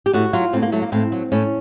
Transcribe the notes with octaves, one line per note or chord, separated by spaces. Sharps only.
G4
A2 F#4
F#3 F4
A2 C4
A#3
F#3 A3
A#3
A2 C4
F#3
A2 C#4